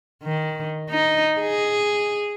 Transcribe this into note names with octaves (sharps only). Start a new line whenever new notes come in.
D#3
D#4
G#4